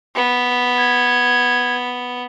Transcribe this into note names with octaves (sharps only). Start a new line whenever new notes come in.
B3
G#6